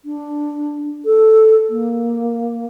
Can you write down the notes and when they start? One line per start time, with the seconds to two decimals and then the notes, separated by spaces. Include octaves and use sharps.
0.05 D4
1.05 A4
1.70 A#3